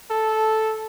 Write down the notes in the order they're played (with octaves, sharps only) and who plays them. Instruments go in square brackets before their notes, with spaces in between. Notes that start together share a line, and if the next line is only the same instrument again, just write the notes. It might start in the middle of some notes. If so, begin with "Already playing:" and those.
[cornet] A4